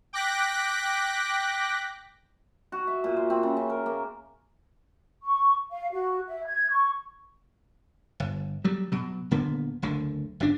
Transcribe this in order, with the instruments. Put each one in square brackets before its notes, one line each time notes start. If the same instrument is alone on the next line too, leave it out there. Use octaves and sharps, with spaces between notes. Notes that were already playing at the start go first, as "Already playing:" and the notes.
[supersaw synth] G5 D6 F#6 A#6 B6
[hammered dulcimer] F#4
E5
A#2
C5
C4
C#3
C#3
A#4
A#3
[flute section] C#6
F5
F#4
E5
G#6
C#6
[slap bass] G1
F#3 G3
B2 F#3
D#1 D3 A#3 B3
F#1 D2 D3
G1 C#3 D4